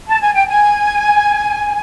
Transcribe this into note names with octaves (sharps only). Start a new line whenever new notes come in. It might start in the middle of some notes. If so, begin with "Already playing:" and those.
A5
G#5
G5
G#5